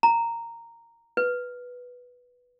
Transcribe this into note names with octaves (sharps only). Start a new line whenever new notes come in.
A#5
B4